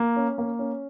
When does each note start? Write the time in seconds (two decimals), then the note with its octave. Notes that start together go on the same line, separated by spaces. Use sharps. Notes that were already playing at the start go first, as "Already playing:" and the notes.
Already playing: A#3
0.16 C#4
0.38 A#3
0.59 C#4